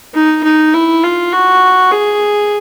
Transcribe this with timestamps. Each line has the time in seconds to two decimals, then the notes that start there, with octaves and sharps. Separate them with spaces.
0.14 D#4
0.44 D#4
0.74 E4
1.03 F4
1.33 F#4
1.92 G#4